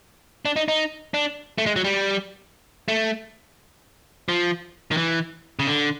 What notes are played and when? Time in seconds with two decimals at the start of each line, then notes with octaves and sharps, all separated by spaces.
0.45 D4
0.56 D#4
0.68 D#4
1.14 D4
1.58 A3
1.66 G#3
1.76 F#3
1.84 G3
2.88 A3
4.29 F3
4.92 D#3
4.97 E3
5.59 C#3
5.67 D3